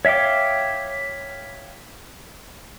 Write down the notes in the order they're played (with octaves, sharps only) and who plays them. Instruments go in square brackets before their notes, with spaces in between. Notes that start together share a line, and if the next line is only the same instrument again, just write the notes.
[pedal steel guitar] C#5 E5 F5 G5 D6